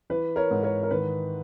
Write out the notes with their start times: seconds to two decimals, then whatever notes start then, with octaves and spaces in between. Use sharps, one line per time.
0.10 E3 B4
0.36 A#4 C#5
0.51 G#2
0.63 A#4 C#5
0.83 A#4
0.91 D#3 B4